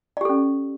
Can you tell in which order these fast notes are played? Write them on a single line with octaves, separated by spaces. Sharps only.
D5 G4 A4 C#4